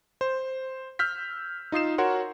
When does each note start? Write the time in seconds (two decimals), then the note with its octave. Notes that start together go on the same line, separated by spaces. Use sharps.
0.21 C5
0.99 E6 F6 G6 B6
1.72 D#4 F4 D#6 C7 E7
1.98 F#4 A#4 C#5 F#5 C6